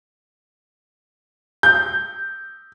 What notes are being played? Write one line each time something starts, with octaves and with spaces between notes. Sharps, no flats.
G6